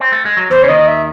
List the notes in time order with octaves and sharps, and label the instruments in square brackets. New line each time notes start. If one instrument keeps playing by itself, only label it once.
[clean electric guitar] C4
A3
G#3
F#3
[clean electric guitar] E2 E3 [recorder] C5
[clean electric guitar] C#3 [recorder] C#5
[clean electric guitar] D#2 D#3 [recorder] D#5
[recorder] E5